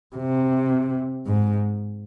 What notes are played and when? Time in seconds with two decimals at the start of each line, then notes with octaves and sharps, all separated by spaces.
0.16 C3
1.27 G#2